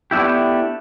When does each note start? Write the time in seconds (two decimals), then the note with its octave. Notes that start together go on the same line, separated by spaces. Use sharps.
0.11 A3 B3 D4 E4 G4